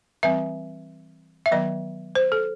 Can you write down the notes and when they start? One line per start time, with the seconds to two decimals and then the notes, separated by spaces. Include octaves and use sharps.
0.23 E3 G3 C4 E5
1.46 E5
1.51 D#3 F#3 B3 D#5
2.15 C5
2.32 A4